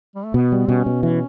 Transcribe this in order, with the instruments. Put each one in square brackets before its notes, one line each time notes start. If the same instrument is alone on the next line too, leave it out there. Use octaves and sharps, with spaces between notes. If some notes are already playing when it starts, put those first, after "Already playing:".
[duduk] G3
A3
[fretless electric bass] B2 [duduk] B3
[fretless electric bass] G3
[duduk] B3
[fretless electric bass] B2 [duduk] C#4
[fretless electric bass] B2
[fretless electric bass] E3 [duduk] C#4